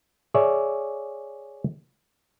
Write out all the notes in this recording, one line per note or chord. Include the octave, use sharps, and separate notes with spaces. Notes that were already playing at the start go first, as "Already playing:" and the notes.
G#4 C#5 D5 E5